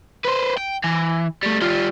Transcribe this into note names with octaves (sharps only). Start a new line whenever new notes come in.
B4 C5
G5
E3
G3 A3
G3 F4